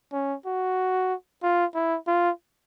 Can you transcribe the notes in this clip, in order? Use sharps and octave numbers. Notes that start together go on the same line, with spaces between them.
C#4
F#4
F4
E4
F4